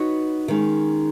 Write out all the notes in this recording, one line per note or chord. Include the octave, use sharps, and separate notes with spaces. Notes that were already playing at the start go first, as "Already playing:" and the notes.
Already playing: B3 D#4 F#4 C#5
D#3 G#3 C#4